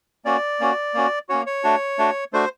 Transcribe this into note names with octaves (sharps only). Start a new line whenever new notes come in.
A#3 C#4 F#4 D5
A#3 C#4 F#4
A#3 C#4 F#4
A#3 C#4 F#4 C#5
C#5
A3 D4 F#4
A3 D4 F#4
A3 D4 F#4 C5